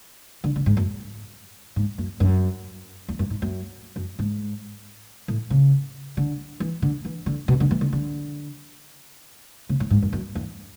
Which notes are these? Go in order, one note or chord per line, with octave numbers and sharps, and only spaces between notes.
D3
D3
G#2
F#2
G#2
F#2
F#2
E2
F#2
G#2
F#2
F#2
G#2
A2
C#3
D3
E3
D3
E3
D3
B2
D3
E3
D3
D3
C#3
A2
G#2
F#2
F#2
E2